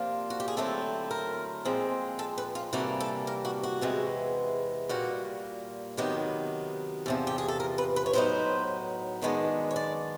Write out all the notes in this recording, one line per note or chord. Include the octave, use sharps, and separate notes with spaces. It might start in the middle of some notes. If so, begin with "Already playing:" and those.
Already playing: C3 F3 A#3 D4 F4
F#4
G4
G#4
D3 F#3 A3 C4 E4 A4
A#4
A#2 F3 G#3 C4
A4
B4
F4
C3 E3 G3 A#3 D4 F#4
A4
A#4
F#4
F#4
E2 C3 E3 G#3 B3
A#2 G3 A#3 F#4
C3 D#3 F#3 B3 G4
E2 C3 F3
G4
G#4
A4
A#4
B4
B4
C#5
A2 F#3 B3 D#4 C5
F#2 D#3 G#3 B3 D4
C#5
D5